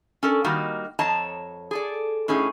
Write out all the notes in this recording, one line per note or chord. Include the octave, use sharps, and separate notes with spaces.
C#4 A4 A#4 D5
D#3 G3 A#3 D#4 F#4 A#4
F2 C#5 D#5 A5 A#5
G#4 A4 D5
A2 C#4 D#4 G#4